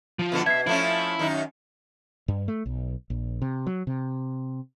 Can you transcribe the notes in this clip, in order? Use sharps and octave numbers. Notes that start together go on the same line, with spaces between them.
F3 F4
B2 D3 B3
B2 E5 G#6 C7
F3 A3 C#4 E4
F#2 D#3 D#4
G2
A3
B1
A#1
C3
F#3
C3